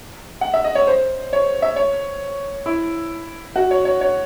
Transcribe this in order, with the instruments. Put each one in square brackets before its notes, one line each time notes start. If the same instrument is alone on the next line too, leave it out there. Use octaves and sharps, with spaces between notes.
[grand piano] F#5
E5
D#5
C#5
C5
C#5
E5
C#5
E4
F#4
C#5
C#5
C#5